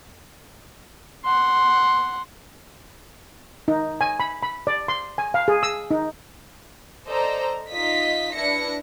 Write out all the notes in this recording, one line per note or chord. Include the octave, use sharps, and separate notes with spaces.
F#5 C6
D#4
G#5
B5
B5
D5
C6
G#5
F5
G#4
E6
D#4
A4 C5 D5 D#5 A#5
D#4 F4 D#5 B6
D4 E4 B4 A#6 C#7